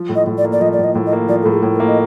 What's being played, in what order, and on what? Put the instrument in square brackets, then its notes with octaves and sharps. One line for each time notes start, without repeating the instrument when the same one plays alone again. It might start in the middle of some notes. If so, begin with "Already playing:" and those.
Already playing: [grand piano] F3
A2
[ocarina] D#5
[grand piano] A2
[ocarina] D5
[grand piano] A#3
[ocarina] D5
[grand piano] F3 [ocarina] D#5
[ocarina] D5
[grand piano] A2
[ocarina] D#5
[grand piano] A2
[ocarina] D#5
[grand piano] A#3
[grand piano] F3 [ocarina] D5
[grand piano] A2 [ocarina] A4
[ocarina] G#4
[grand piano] A2
[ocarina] A#4
[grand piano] A#3
[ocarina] D#5